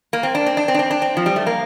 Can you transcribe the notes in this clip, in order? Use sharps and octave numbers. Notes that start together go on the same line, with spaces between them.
A#3
C4
D4
C4
D4
C4
D4
C4
D4
C4
F3
G3
A3
A#3